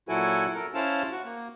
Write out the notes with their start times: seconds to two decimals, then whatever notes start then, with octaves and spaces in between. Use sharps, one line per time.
0.09 A#2 F#3 E4 F#4 A4 G#5
0.54 A4 A#4
0.74 C#4 E4 C5 F5 A5
1.12 F#4
1.25 A#3